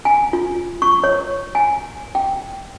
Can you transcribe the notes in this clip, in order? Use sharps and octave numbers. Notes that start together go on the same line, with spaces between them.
G#5
F4
C#6
C#5
G#5
G5